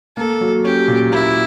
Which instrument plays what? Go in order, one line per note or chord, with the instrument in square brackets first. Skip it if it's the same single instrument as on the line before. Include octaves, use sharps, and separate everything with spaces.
[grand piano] A#3 [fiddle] A4
[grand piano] F#3
[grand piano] C#4 [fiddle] G4
[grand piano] A#2
[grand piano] A#3 [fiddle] E4